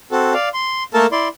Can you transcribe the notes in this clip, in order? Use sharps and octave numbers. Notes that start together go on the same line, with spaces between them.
C4 F#4 A4
D5 F5
C6
A3 A#3 A4 A#4 A5
E4 D5 C6